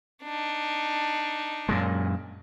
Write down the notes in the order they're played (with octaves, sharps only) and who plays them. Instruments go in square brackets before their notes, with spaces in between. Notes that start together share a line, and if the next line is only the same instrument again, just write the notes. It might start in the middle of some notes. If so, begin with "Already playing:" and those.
[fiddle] D4 D#4
[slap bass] F#2 A#2 G#3